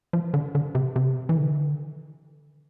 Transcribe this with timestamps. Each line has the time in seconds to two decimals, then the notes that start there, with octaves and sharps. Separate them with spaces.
0.13 F3
0.34 D3
0.55 D3
0.75 C3
0.96 C3
1.29 E3
1.37 D3